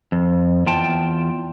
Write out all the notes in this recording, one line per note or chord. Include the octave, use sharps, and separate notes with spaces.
F2
E2 F4 G5 A5